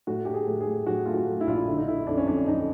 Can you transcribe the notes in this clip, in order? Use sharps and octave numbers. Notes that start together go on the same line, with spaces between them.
A2 F#4
A3 G4
G#4
A2
G#4
A2
A2 F#4
A3 F4
F#4
A2
E4
A#1 F4
E4
D3 E4
D#4
D3 E4
F2 D4
C#4
F2 D4
F2 D#4